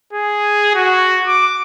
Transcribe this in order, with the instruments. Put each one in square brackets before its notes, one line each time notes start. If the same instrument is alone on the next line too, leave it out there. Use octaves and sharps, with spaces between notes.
[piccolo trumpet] G#4
F#4
D6